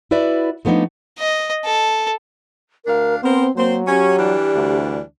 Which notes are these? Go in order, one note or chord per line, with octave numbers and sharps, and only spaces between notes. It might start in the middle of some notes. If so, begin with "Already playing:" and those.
E4 F#4 B4 D5 E5
F3 A3 B3 D4 D#4
D#5
A4
D2 D4 A#4 F5
B3 C4 A#4 C5
F#3 A#3 C4 C5
C#4 G4
E3 G3 D4
D2